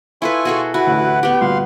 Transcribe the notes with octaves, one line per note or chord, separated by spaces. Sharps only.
E4 F4 A4 B4 G#5 C#6
B2 F#4 G#4 A4 F#5 D#7
E4 F#4 B4 F#5
A1 D2 A2
B3 G4
D2 G2 A#2 F5 C6